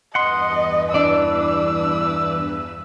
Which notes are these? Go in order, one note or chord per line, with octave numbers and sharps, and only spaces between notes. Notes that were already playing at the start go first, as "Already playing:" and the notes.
E2 G2 B4 D#5 F#5 C6
E3 D4 D5 E6